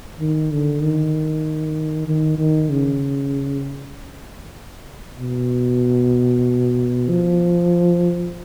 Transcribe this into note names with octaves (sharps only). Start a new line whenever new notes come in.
D#3
D3
D#3
D#3
D#3
C#3
B2
F3